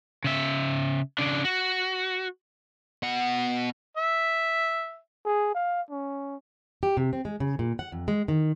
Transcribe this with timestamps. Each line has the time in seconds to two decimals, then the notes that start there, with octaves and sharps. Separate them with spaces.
0.24 C#3 E5
1.19 C#3 D4
1.45 F#4
3.03 B2 F#5
3.97 E5
5.25 G#4
5.55 F5
5.91 C#4
6.83 G4
6.97 C3
7.13 C4
7.25 G#3
7.40 C#3
7.59 A#2
7.79 F#5
7.92 F2
8.08 G#3
8.28 D#3